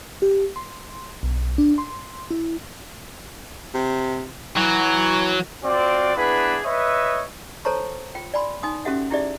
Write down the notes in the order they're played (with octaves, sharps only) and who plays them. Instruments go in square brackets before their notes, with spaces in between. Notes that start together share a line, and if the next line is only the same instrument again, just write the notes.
[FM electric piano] G4
C6
B1
D4
C6
E4
[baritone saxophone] C3
[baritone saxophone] E3 [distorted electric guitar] F#3
[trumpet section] C4 F4 F#4 D5
B3 D4 E4 G#4 B4 B5
B4 C#5 D#5 E5
[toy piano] A4 C5 C#5 A5 A#5 C#6
F4 G5
D5 G#5 B5 C6
D#4 G#5 C6 D#6
C#4 F#4 G4 A4 E5 F#5
D#4 E4 G4 G#4 D5 E5